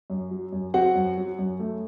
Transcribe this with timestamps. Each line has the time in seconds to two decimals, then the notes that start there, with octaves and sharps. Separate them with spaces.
0.10 F#2
0.31 F#3
0.53 F#2
0.74 C4 F#4 F#5
0.95 F#2
1.18 F#3
1.39 F#2
1.60 A3